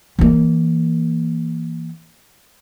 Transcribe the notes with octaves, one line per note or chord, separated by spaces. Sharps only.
E3 A#3